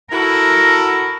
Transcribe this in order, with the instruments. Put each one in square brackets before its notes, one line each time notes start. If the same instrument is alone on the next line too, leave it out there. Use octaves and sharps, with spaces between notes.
[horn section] E4 F#4 A4 [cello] A#4